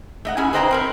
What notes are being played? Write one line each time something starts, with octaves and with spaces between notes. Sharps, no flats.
A3 D#5 F#5
C#4 E4 G#4 G#5
G#4 B4 C5 D#5 G5 A#5
C4 A#4 B4